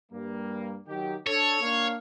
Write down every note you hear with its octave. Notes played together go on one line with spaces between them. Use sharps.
G2 G3 A#3
D#3 F#3 G4
D4 A4 C#5
A#3 D4 F5